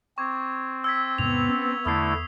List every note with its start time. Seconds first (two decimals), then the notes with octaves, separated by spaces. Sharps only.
0.18 C4 C#6 D6 G#6
0.84 E6 G#6 B6
1.18 E2 G#2 C3 B3 F7
1.49 C#4
1.86 E2 D3 A3 E4 D#6 E6 C7